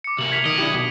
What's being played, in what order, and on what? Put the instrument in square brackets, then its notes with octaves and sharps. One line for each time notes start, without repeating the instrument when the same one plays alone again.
[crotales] D6 C#7
[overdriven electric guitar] C3 A#3 [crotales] F#7
[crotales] G#6 B6 F7
[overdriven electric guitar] B1 D#5 [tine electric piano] D#3 [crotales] D7
[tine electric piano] D4 E4 G4
B2